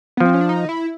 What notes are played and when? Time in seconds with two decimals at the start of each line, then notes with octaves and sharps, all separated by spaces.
0.17 B3
0.20 F3 C4
0.34 C#4
0.41 D4
0.49 D#4
0.69 E4